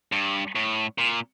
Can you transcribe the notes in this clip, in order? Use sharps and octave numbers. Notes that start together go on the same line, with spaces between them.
G2
A2
A#2